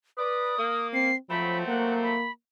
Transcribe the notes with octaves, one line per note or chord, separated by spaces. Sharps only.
B4 D5 D#6
A#3
C4 C7
F3 F#3 A3 C4 B5
A#3 F#5
B5